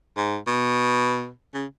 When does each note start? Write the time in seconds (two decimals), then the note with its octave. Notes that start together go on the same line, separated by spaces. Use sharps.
0.17 G#2
0.47 B2
1.54 C#3